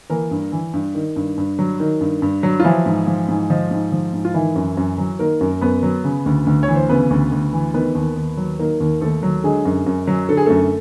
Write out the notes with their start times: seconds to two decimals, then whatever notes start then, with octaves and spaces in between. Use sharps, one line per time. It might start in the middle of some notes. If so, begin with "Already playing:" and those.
0.10 E3 A#3 A#4
0.31 G2
0.52 E3
0.73 G2
0.95 D#3
1.16 G2
1.38 G2
1.59 F#3
1.80 D#3
2.01 G2
2.22 G2
2.43 F#3
2.60 F4
2.64 E3 F3 E4
2.86 G#2
3.07 F3
3.28 G#2
3.50 F3 D#4
3.71 G#2
3.92 F3
4.13 G#2
4.25 F4
4.34 D#3 E3 E4
4.56 F#2
4.77 F#2
4.98 F#3
5.19 D#3 A#3 A#4
5.41 F#2
5.61 F#2 B3 B4
5.83 F#3
6.04 C#3
6.26 D2
6.46 D2
6.63 C#5
6.68 E3
6.76 C5
6.89 C#3 B3 B4
7.10 D2
7.32 D2
7.53 E3
7.74 D#3 B3 B4
7.95 D#2
8.17 D#2
8.37 F#3
8.59 D#3 A#3 A#4
8.80 D#2
9.01 D#2 A3 A4
9.23 F#3
9.44 D3 G#3 G#4
9.65 F#2
9.86 F#2
10.07 F#3
10.29 D3 A4
10.37 G#4
10.46 F#2 A3 A4